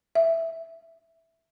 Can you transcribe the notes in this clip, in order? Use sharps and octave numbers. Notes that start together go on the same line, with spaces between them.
E5